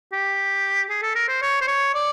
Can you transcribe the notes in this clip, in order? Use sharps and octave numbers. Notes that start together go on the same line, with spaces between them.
G4
G#4
A4
A#4
C5
C#5
C5
C#5
D5